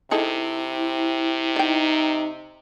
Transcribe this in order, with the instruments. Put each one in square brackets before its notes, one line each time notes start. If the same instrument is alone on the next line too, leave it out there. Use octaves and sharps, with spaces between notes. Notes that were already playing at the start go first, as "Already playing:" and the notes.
[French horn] C3 [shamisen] D#4 G#4 A4 [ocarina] E4
[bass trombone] D#4 [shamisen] D5 G5